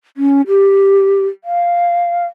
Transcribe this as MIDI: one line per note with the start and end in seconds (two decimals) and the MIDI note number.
0.17 0.41 61
0.47 1.26 67
1.44 2.26 77